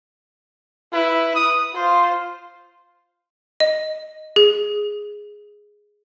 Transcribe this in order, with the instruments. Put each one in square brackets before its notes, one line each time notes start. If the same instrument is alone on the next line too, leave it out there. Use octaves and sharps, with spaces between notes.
[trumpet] E4 [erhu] B4
[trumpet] D#6
[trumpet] F4 [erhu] C5
[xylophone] D#5
G#4